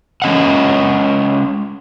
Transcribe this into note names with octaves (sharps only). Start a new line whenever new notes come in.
G#3 C#4 D#5 F#5